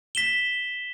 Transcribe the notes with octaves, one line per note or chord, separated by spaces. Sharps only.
B6 E7 G7